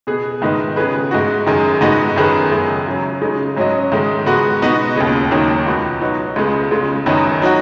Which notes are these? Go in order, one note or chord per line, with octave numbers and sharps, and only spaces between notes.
B2 B3 G#4
G#2 D#3 B3 D#4 B4
C#3 B3 G#4 B4
G#2 G#3 D#4 F#4
F#2 D#3 G#3
G#2 G#3 B3 D#4 F#4
F#2 D#3 B3 G#4 B4
F#2 C#3 G#3
F#2 C#3 F#3
C#3 G#3 D#4
G#2 F#3 C#4 F#4 D#5
G#2 D#3 G#3
G#2 G#3 B3 F#4
B2 B3 D#4 F#4
D#2 C#3 G#3
D#2 D#3 F#3 D#4
C#2 B2 B3 F#4
F#3 D#4 F#4 B4
C#2 C#3 G#3 B3
C#2 C#3 G#3
F#2 D#3 F#3 B3 D#4
F#3 D#4 F#4